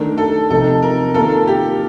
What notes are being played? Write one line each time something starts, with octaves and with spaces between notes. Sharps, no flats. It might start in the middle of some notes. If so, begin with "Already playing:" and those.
Already playing: D#3 A3 D4 A#4
A4
C3 F3 C4 D#4 A4
A#4
D#3 A#3 F4 A4 A#4
G4